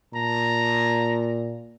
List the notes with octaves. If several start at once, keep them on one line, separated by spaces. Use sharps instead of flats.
A#2 A5 A#5